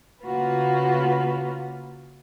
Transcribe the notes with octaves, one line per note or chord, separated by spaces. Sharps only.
C#3 A#3 F4 F#4 B4